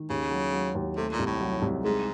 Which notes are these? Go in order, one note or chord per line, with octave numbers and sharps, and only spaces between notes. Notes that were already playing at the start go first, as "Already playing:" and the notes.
Already playing: D#3
D#2 C#3
F#3
F#3
D#2
C3 A3
A#2
C2
A2
F#3
C2
G#2 G#3